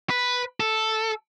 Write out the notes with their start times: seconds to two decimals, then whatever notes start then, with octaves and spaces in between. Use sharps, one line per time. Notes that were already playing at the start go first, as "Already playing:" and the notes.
0.09 B4
0.60 A4